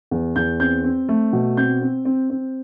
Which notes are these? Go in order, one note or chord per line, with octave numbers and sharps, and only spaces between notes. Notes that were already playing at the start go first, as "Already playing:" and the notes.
E2
E2 G6
C4 G6
C4
A3
B2
C4 G6
C4
C4
C4